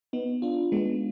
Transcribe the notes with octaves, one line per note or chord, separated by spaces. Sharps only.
B3 D#4
D4 F4
G#3 B3